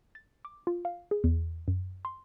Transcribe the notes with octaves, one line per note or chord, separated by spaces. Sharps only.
A6
D6
F4
F5
G#4
E2
F#2
C6